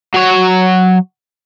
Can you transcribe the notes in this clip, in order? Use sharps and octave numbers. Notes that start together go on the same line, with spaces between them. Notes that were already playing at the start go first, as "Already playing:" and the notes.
F#3 C#5